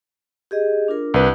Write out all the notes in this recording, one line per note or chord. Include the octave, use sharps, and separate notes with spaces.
G4 G#4 D#5
D4 F4 A#4
C2 B4